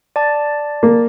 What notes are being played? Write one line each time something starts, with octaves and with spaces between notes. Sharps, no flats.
D5 A5
A#3